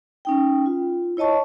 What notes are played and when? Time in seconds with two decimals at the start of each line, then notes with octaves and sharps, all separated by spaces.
0.25 C#4 D#4 G5
0.66 F4
1.17 E4 C#5 D#5 A5 C#6